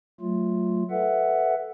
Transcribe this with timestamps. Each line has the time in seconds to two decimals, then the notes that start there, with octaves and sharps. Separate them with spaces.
0.20 F#3 A3 F4
0.90 A4 B4 E5 F#5